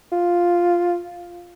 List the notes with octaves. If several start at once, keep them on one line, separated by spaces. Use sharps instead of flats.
F4